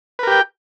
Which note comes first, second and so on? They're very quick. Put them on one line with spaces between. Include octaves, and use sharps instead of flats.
B4 A#4 G4 G5